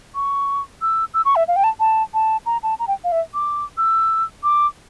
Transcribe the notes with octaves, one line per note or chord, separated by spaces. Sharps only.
C#6
E6
E6
C#6
E5
F5
G5
A5
A5
A5
A#5
A5
A#5
G5
F5
E5
D6
E6
D6